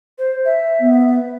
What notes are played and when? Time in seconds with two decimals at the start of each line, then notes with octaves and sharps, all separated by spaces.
0.18 C5
0.45 E5
0.80 B3